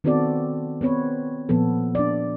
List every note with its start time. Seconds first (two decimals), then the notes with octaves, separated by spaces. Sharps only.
0.04 D#3 B3 C4 F#4 A4 D5
0.81 B3 C4 B4 C#5
1.49 A#2 F3 B3 A4
1.95 D4 D5